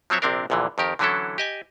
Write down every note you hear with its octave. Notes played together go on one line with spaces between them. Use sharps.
F3 F#3 C4 C#5 E5
A#1 C3 C4 D4 A#4
A#1 E2 A#2 D3 E3
F2 D#3 G4 A#4
D3 E3 F#3 C#4 E4 A4
G4 D#5 G#5